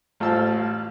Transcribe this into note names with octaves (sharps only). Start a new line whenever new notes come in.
A1 F4 C5 F5 A5 E6